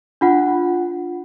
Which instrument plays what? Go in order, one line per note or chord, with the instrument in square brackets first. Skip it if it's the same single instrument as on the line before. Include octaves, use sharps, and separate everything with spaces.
[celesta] D4 F4 F#5